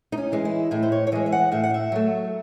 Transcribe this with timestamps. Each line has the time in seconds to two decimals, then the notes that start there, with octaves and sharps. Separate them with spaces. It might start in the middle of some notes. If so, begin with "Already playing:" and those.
0.12 D#4
0.17 C#4
0.32 E3 G#3
0.45 E4
0.71 A2 E4
0.83 C5
0.92 C#5
1.07 C#5
1.12 E3 G#3 D#5
1.26 E5
1.32 F#5
1.52 A2 E5
1.64 F#5
1.74 E5
1.92 F#3 A3